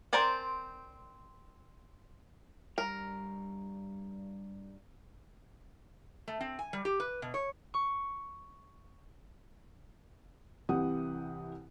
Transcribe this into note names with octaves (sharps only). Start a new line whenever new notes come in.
C4 A#4 C5 D5 G#5
G2 G3 A#4 A#5
A3
C4
G#5
G3
G4
B4
B2
C#5
C#6
C2 C3 E3 G4 F#5 D#6